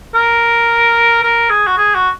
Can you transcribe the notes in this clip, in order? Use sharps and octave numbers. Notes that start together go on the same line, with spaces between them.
A#4
A#4
G#4
F#4
G#4
F#4